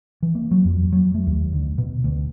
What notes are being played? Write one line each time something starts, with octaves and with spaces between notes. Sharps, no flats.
E3
A#3
F#3
F2
F#3
A3
D#2
D2
B2
D2